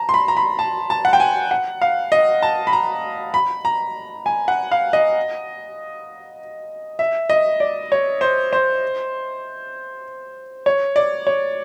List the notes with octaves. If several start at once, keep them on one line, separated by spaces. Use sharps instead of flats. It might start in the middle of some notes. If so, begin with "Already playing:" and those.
Already playing: A5 A#5
C6
B5
A#5
B5
A5
A5
F#5
G5
G#5
F#5
F5
D#5
A5
B5
A#5
B5
A#5
G#5
F#5
F5
D#5
E5
D#5
D5
C#5
C5
C5
C#5
D5
C#5